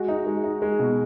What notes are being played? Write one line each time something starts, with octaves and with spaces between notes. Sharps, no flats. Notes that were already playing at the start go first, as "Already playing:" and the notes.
Already playing: G#3 F#4
D#4
G#3
D#4
G#3
B2